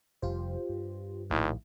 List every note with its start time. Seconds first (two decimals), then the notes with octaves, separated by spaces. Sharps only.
0.22 F1 F2 G3 F4 G4 C5
0.69 G2
1.30 A#1 D#2 A2 E4